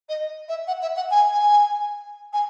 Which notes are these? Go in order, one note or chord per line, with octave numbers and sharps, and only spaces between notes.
D#5
E5
F#5
E5
F#5
G#5
G#5
G#5